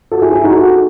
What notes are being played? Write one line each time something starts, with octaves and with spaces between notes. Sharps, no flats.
F#4 A4
E4 G#4
E4 G#4
D#4 F#4
F#4 A4